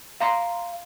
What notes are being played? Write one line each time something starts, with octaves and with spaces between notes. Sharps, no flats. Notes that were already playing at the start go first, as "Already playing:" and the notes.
F5 A#5 C6